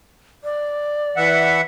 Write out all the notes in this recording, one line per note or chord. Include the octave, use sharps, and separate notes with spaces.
D5
E3 E5 F#5